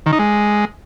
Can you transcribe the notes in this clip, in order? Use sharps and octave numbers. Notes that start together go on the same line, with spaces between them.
D#3
D#4
G#3